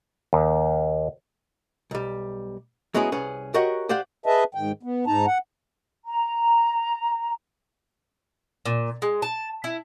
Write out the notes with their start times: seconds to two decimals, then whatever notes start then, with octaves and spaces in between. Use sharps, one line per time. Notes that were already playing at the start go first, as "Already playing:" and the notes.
0.33 D#2
1.91 B1 G3
2.94 F#3 G#3 B3 C#4 E4 G#4
3.12 C2 C#4 G#4 B4
3.54 F#4 G4 A#4 C#5 D#5 F#5
3.89 G4 C5 D5 F5 F#5
4.26 G#4 B4 D#5 E5 A5
4.55 G#2 D#3 G5
4.83 B3
5.07 G#2 D#4 A5 A#5
5.26 F#5
6.06 A#5
8.66 A#2
9.02 G#3
9.22 A5
9.64 E4